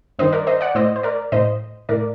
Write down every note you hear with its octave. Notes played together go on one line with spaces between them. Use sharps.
G2 D#3 C5 D#5
A#4 D5
C5 D#5
D5 F#5
A2 C5 D#5
C5
A#4 D5
A2 C5 D#5
A2 A#4 D5